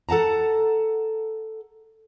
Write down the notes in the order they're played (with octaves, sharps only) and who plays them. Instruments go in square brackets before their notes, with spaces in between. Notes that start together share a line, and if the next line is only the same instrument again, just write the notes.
[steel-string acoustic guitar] A4 F#5 A5 A#5